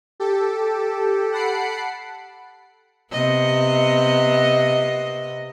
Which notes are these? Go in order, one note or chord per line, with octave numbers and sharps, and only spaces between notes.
G4 A4
F#5 A5 B5 C7 D7
C3 B3 D#5